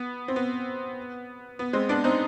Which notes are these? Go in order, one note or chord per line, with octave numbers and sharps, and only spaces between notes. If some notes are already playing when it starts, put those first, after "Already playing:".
Already playing: B3
C4
B3
B3
G#3 C4
B3 D4
C4 D#4